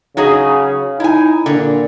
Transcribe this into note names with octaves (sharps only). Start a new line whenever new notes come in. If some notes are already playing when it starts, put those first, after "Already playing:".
C#3 F#3 D#4 G#4
D#4 E4 G#5
A#2 D3